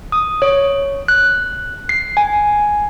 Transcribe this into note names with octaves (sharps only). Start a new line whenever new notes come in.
D#6
C#5
F#6
C7
G#5